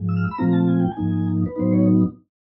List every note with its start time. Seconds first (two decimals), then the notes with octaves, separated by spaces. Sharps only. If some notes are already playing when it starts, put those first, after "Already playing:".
Already playing: G#2 F3 G#3
0.09 E6
0.16 F6
0.24 E6
0.31 B5
0.38 A#2 F3 A3 C4 F4 A#5
0.53 A5
0.68 G#5
0.80 G5
0.92 G#5
0.97 G#2 F3 A#3 D#4
1.46 B4
1.56 A2 F#3 B3 D#4 C5
1.73 C#5